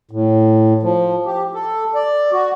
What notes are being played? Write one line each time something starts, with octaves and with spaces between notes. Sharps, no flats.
A2
F3
G4
A4
D5
F#4